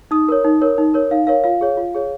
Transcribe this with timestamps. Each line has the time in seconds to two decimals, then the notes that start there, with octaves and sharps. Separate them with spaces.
0.11 D#4 D#6
0.29 A#4 C#5
0.44 D#4
0.61 A#4 C#5
0.78 D#4
0.94 A#4 C#5
1.11 D#4 F5
1.27 A#4 C#5 F5
1.44 F4 F5
1.61 G#4 C#5
1.77 F4
1.95 G#4 C#5